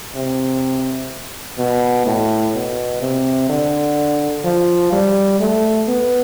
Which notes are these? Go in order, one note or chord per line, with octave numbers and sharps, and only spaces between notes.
C3
B2
A2
B2
C3
D3
F3
G3
A3
B3